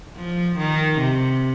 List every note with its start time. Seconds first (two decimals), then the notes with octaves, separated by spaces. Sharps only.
0.17 F3
0.58 D#3
0.99 C3